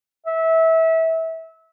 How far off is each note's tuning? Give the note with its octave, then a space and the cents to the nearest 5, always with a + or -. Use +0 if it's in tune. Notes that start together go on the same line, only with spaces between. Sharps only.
E5 -25